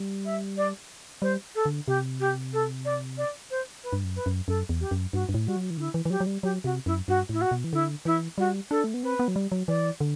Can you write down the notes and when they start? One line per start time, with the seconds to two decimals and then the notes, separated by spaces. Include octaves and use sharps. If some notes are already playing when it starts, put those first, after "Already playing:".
Already playing: G3
0.25 E5
0.57 D5
1.22 G3 C5
1.55 A4
1.65 D3
1.87 C3 G4
2.20 G4
2.53 A4
2.85 D5
3.17 D5
3.50 C5
3.83 B4
3.93 G2
4.04 F#2
4.15 B4
4.26 F#2
4.48 F#2 A4
4.69 E2
4.80 G4
4.91 F#2
5.13 G2 F#4
5.29 G2
5.34 A2
5.46 G3 F#4
5.56 F#3
5.70 E3
5.77 D3 E4
5.94 E3
6.05 E3
6.10 F#3 G4
6.20 F#3
6.27 G3
6.43 F#3 G4
6.64 C3 F#4
6.86 F#2 E4
7.08 G2 F#4
7.29 A2 E4
7.41 F#4
7.51 B2
7.64 E3
7.73 D3 E4
8.05 E3 E4
8.38 G3 F#4
8.70 D4 A4
8.84 A3
8.94 B3
9.03 C4 B4
9.19 B3
9.28 F#3
9.36 G3
9.52 F#3
9.68 E3 D5
10.00 D3